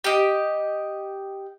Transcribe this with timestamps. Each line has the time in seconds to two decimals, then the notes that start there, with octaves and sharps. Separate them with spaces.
0.04 G4 D#5